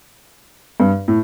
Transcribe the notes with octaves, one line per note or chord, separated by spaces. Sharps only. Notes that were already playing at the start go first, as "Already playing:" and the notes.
G2
A2